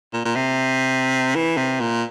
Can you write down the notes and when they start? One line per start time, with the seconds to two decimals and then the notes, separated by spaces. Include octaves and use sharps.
0.13 A#2
0.25 A#2
0.36 C3
1.35 E3
1.57 C3
1.80 A#2